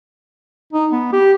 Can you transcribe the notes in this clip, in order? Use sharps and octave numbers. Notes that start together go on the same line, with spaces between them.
D#4
B3
G4